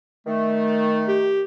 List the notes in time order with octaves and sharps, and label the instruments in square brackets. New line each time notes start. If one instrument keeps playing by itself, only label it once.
[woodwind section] D#3 A3
[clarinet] G4